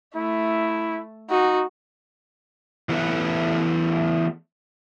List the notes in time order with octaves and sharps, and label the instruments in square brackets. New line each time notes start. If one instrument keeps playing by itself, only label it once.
[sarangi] A3 [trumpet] E4
[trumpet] D#4 [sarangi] F#4
[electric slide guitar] E3 F#3 A3 B3 B4 C#5